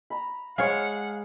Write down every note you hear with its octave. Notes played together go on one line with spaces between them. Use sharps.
A#5 B5
G#3 G#4 C#5 F5 F#5